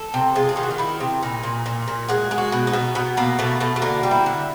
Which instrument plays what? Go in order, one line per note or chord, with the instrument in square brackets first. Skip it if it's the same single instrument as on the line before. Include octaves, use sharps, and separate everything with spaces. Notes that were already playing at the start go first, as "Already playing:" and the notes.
Already playing: [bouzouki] A4
C3
G#3 F4
G#4
D#3 G4
F#4
F4
D#3 E4
C3
A#2 D#4
A#2
A#2
A#2
G#3 F#4
G#3
F#4
B2
D#4
B2
B2 B3
B2 A#3
B2 A3
B2 A3
A3
D3 A#3
G3
E4
D3